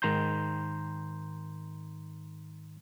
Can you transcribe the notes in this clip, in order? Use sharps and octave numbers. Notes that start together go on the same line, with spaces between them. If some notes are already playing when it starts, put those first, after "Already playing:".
G#2 D#3 A#5 C6 G6